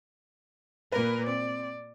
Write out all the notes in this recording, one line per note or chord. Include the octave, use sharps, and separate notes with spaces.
A#2 A#3 A#4 B4
C4 D5